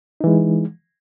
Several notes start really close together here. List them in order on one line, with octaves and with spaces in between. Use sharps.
D#4 E3 G#3